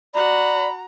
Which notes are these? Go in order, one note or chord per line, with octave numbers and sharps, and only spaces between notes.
F#4 D5 F#5 A#5 B5